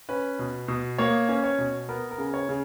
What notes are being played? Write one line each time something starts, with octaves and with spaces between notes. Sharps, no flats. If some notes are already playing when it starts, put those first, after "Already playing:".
C#4 B4
B2
B2
A#3 C#5
C#4
C#5
B2
B3 A#4
A#4
C#3
C#5
C#3